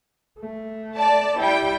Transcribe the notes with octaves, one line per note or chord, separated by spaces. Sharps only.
A3
D5 A5
G3 E4 G5